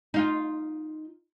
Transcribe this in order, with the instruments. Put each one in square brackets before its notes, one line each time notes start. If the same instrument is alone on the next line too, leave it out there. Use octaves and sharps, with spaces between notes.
[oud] D#4 F4